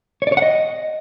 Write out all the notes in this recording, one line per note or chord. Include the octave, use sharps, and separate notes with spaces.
C#5
D5
C#5
F#5
D#5